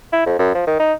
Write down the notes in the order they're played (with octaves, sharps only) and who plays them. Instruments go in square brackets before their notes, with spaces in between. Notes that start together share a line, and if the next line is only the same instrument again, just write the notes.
[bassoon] E4
F2
F#2
F3
D#3
D#4